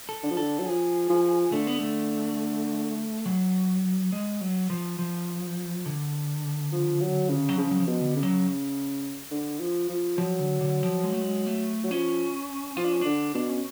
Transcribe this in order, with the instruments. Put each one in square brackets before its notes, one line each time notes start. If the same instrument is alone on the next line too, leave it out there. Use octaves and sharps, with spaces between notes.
[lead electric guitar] A4
[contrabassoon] D3
F3
[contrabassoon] D3 [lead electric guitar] A4
[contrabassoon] F#3
[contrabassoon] F3 [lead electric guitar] G#4
[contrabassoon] F3
[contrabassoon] D3 [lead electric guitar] A3
[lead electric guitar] B3
A3
F#3
G#3
F#3
F3
F3
D3
[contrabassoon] F3
F#3
C#3
[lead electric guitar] F#3
[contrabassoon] C#3 [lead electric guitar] F3
[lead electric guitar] F#3
F3
[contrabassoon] B2
[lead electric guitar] D3
[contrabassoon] C#3
[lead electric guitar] F#3
[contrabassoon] D3
F3
F3
[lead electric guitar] F3 [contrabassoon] F#3
[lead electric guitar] D3
D3
F3
G#3
A3
G#3
A3
[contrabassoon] F#3
[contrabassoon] F3 [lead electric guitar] C#4
[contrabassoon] F3 [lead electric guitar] F4
[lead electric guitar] D4
C#4
[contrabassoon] D3 [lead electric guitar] D4
[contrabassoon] B2 [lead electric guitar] D4
[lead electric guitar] C#4